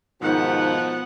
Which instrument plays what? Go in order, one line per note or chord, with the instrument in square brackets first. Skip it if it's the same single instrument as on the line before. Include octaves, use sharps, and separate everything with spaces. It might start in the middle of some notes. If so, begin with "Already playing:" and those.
[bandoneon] G#2 D#3 [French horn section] B2 F3 [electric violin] B3 F#5 [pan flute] D#4